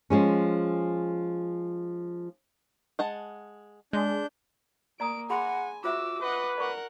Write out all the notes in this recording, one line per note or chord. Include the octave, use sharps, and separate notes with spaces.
F3 G#3 C#4
G#3 F#5 A5
G#3 D4 G6
A#3 D5 A#5 D#6 D7
G#4 F#5 G#5 B5 C6
F4 F#4 C5 E5 D6 E6
B4 D#5 F#5
A#4 D5 F#5 C#6